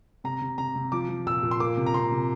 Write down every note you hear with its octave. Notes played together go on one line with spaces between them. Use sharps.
C3 A#5
C3
C3 A#5
C3
F3 D6
F3
A#2 E6
A#2
C6
A#3 D6
C3
A#5
C3 C6
C3